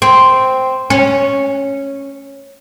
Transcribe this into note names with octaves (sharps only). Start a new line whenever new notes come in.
C4
C#4